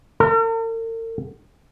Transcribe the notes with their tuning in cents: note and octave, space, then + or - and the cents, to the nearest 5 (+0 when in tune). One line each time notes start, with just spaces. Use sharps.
A#4 -45